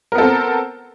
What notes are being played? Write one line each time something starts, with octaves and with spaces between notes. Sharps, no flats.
B3 C4 A4 A#4